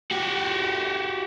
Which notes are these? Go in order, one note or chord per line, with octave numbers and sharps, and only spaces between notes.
F#4 G4